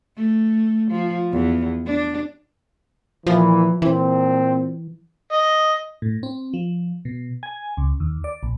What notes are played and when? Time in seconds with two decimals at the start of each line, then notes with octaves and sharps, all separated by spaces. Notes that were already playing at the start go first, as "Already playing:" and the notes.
0.16 A3
0.91 F3
1.32 E2
1.86 D4
3.27 A#2 E3 F3
3.82 A#2 E3 C4
5.32 D#5
6.02 A2
6.23 C4
6.54 F3
7.05 B2
7.43 G#5
7.77 C#2
8.00 D#2
8.24 D5
8.43 A#1